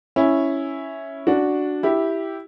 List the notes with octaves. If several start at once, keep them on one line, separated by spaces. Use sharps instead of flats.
C#4 E4
D4 F#4
E4 G4